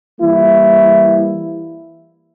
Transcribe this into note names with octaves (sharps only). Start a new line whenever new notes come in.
E3 G3 A#3 E4